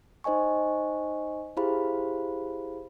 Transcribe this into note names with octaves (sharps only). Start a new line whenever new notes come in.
D#4 C5 D#5 G#5 C#6
E4 G4 G#4 C5 F5 B5